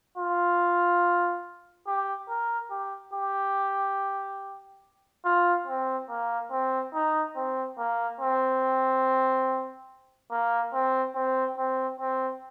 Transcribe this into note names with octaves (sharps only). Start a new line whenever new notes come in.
F4
G4
A#4
G4
G4
F4
C4
A#3
C4
D#4
C4
A#3
C4
A#3
C4
C4
C4
C4